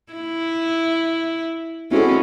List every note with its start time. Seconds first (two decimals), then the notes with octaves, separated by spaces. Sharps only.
0.12 E4
1.91 G#3 C4 C#4 E4 F#4 A4